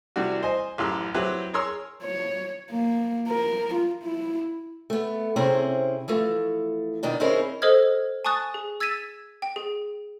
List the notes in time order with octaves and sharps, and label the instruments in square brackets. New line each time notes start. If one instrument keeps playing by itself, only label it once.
[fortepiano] C3 E3 G3 D4 F#4
C5 D#5 G#5
A1 F#2 E3 G4 C6 E6
F#3 C4 E4 G4 B4
G#4 A#4 C#5 A#5 C6 E6
[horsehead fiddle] C#5
A#3
A#4
F4
E4
[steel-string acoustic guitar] A3 B3
C3 C4 C#4 E4 G#4
E3 F3 A3
B2 D#3 D4 D#4
C4 C#4 D#4 E4 G#4 A#4
[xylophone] A4 C5 D#5 D#6 F6 G#6
G#5 A5 C#6 D#6 F#6 A6
G#4
E6 G#6 A6 B6 D#7 E7
G5
G#4